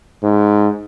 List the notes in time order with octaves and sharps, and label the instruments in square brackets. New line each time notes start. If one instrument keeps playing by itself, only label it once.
[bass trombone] G#2